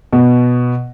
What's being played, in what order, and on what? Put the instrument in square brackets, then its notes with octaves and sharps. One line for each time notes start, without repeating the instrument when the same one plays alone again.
[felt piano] B2